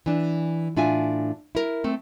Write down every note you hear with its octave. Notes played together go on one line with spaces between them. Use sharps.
E3 D4
A2 D4 F4 E5 G#5
E4 A#4
A3 C4